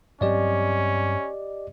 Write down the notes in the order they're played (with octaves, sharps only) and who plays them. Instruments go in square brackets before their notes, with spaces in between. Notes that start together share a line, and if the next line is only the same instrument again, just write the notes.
[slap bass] G2 F#3 C4 [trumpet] C#4 [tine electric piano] G4 D5 D#5